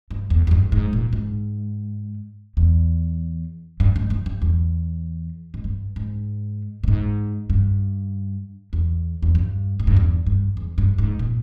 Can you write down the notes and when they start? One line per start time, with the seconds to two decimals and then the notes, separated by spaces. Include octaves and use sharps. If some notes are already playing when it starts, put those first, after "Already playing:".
0.11 G2
0.30 E2
0.47 E2
0.51 G2
0.72 G#2
0.93 A#2
1.13 G#2
2.57 E2
3.80 G2
3.96 G#2
4.10 G2
4.26 G2
4.42 E2
5.54 G#2
5.64 G2
5.96 G#2
6.83 A#2
6.88 G#2
7.50 G2
8.73 E2
9.22 E2
9.35 G2
9.80 G#2
9.87 G2
9.97 E2
10.26 G2
10.57 E2
10.78 G2
10.98 G#2
11.19 A#2